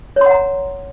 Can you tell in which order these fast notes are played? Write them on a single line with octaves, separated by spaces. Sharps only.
C#5 C6 F#5 A#5